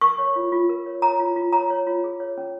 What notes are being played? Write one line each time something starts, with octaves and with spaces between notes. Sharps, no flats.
A#4 C#6
C#5
F4
F4
A#4
C#5
C#5 A#5
F4
F4
C#5 A#5
C#5
F4
G#4
C#5
C#4